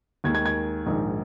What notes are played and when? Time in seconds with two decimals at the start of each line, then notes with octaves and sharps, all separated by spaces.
0.24 D#2 D#3 G#3 G#6
0.35 G#6
0.46 G#6
0.86 A#1 G#2 D#3